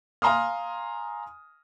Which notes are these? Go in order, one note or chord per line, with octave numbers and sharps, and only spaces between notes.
F5 G#5 A#5 C6 D#6 F6